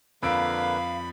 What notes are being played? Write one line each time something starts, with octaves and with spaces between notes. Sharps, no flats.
F2 D3 A#3 B4 F5 B5 E6 D7